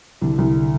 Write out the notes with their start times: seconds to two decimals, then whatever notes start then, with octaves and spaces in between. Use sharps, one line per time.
0.21 C2 D3 D4
0.38 C2